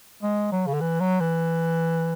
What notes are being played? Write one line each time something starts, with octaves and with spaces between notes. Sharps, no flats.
G#3
F#3
C#3
D3
E3
F#3
E3